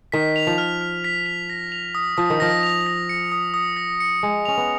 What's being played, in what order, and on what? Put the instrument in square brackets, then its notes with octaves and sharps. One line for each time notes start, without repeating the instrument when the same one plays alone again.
[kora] D#3 [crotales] B6
[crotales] F7
[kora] F3
[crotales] F6
F6
B6
F7
A#6
F7
D#6
[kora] F3 [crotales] D#6
[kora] D#3
[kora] F3 [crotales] A#6
[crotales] F7
A#6
C#7
D#6
D#6
A#6
C#7
[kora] G#3 [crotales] C#7
[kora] C#4 [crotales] F7
[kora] B3